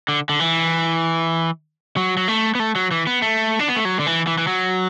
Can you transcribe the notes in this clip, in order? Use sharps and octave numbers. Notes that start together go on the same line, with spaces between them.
D3
D3
E3
F#3
F#3
A3
B3
A3
F#3
E3
B3
A3
D4
B3
A3
F#3
D3
E3
E3
E3
F#3